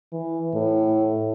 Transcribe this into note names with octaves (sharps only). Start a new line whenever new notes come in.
E3
A2